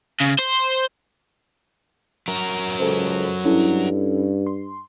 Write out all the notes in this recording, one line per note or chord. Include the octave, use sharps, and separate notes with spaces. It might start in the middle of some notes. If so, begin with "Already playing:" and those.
C#3
C5
F#3 A#4
C#2 A4 C5
G2 C#4 E4 A4
C6